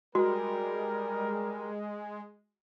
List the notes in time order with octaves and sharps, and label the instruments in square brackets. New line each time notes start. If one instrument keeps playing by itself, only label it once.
[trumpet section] G3 A#4 [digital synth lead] G#3 [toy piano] F#4